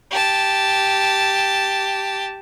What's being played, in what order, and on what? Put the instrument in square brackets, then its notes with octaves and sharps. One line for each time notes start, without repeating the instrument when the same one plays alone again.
[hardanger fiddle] G4 A5